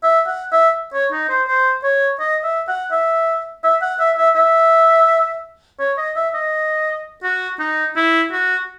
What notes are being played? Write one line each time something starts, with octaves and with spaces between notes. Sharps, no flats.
E5
F#5
E5
C#5
D#4
C5
C5
C#5
D#5
E5
F#5
E5
E5
F#5
E5
E5
E5
C#5
D#5
E5
D#5
F#4
D#4
E4
F#4